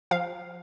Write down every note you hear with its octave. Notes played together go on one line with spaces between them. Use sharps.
F3 F5